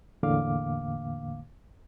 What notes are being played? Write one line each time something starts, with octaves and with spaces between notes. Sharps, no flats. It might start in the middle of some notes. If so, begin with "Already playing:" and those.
E2 A2 D3 A#3 F5 D6